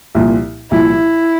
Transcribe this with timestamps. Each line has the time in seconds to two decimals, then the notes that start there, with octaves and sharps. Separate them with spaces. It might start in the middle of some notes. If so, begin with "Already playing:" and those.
0.15 C2 A#2 F3
0.70 C2 A#2 F3 E4